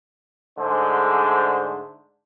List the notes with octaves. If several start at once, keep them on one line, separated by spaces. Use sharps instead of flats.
G#2 D3 G#3 A3 D4 C5